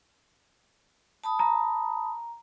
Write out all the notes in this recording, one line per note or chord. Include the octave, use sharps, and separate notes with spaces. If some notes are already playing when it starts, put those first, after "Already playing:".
A5 B5 D#6
A#5